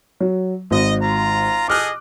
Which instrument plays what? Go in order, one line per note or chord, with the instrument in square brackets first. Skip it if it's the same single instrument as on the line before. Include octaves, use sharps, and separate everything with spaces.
[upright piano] F#3
[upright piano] G#1 [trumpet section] D#5
[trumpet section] F4 A#5
[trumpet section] G#4 A4 D#5 [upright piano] D6 F6 F#6